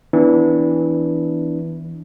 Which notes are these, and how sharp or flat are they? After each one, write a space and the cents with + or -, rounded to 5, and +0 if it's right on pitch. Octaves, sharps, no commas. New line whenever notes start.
E3 -10 B3 +15 D4 -10